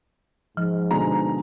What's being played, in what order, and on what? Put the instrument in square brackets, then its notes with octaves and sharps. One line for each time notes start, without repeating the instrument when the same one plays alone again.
[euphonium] G#2 [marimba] F3
[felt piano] B2 D3 G#3 [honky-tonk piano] A#5